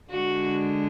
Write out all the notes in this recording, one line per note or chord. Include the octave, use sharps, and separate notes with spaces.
D3 G#3 D4 F#4